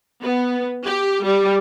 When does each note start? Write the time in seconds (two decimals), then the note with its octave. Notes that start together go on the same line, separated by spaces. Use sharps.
0.23 B3
0.86 G4
1.25 G3